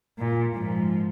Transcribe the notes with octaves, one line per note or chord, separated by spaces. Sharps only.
A#2
G#2 F3